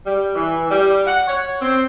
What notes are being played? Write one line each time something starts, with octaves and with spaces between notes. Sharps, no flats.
G3
E3
G3
F#5
C#5
C4